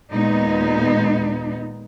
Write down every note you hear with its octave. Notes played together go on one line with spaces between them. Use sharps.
D#2 A#2 G#3 B3 D#4